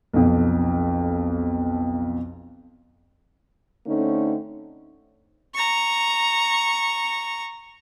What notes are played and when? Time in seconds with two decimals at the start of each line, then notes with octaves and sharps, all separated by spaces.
0.14 B1 F2
3.86 D3 A3 C4 C#4 D#4
5.55 A#5 C#6